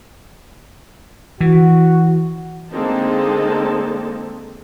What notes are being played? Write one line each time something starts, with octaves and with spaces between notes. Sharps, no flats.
E3 F#4
D3 G#3 A#3 C4 D#4 A5